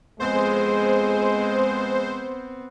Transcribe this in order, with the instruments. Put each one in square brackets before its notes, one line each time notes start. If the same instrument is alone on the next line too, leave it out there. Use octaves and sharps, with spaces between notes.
[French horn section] F2 G#3 [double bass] B3 C4 [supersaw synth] C5